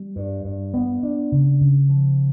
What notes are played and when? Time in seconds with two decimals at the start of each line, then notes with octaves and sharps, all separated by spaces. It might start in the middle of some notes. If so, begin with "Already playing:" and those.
Already playing: G3
0.16 G2
0.44 G2
0.74 B3
1.03 D4
1.32 C#3
1.61 C#3
1.89 F3